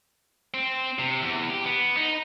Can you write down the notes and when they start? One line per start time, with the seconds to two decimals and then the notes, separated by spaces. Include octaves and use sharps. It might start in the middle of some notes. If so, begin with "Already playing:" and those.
0.54 C4
0.99 C3
1.22 E2
1.50 G4
1.64 B3
1.97 D#4